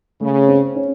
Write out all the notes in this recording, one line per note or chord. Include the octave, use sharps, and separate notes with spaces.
C#3 A3
C4
C#4